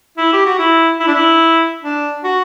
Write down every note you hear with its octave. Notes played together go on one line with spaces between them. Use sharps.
E4
G4
F#4
E4
E4
D4
E4
D4
F#4